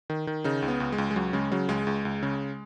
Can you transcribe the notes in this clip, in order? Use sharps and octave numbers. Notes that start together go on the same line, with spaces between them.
D#3
D#3
C#3 D#4
C#2
B3
C#2
G#3
C#2
G#3
C#2 F#3
C#3 G#3
C#3 F#3
C#2 G#3
C#2
C#2
C#3